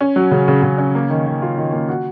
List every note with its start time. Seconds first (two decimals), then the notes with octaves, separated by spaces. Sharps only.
0.01 C#4
0.16 F#3
0.31 C#3
0.48 C#3
0.63 C#3
0.78 C#4
0.95 A#3
1.10 D#3
1.26 D#3
1.42 F4
1.58 D#3
1.73 A#3
1.89 F#4